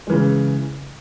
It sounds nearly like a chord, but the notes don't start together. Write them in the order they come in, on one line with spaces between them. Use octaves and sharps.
G#3 E3 C#3